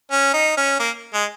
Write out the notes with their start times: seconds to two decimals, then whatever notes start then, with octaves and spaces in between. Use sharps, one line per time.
0.12 C#4
0.34 D#4
0.57 C#4
0.80 A#3
1.14 G#3